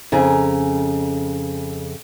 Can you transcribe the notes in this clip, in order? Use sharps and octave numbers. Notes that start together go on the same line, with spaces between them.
F2 C#3 G#5 A#5